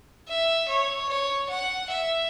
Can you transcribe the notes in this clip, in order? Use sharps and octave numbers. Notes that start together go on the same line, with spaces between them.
E5
C#5
C#5
F#5
E5